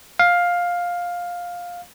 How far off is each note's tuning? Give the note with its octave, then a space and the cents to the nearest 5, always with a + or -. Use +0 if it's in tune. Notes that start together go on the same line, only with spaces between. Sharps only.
F5 +10